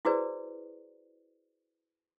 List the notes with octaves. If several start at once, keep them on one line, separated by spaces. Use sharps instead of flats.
E4 F#4 G#4 B4 C5 D5